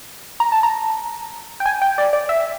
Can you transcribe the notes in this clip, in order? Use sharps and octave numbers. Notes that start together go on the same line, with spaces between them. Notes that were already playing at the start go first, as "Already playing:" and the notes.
A#5
A5
A#5
G5
G#5
G5
D5
D5
E5